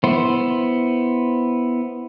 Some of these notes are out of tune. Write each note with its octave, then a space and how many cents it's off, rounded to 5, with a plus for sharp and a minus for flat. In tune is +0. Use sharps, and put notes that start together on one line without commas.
B3 +0 E4 +0 C5 +0